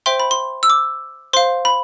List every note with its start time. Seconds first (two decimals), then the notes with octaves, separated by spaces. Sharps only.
0.06 C5 E5 G5 C6
0.20 B5
0.31 C6
0.63 E6
0.70 D6
1.33 C5 F5 C6
1.65 B5